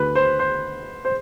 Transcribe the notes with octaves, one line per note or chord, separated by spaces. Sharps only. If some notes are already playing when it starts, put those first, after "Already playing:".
Already playing: D2 B4
C5
C5
C5